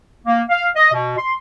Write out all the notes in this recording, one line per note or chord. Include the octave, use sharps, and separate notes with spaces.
A#3
F5
D#5
B2
C6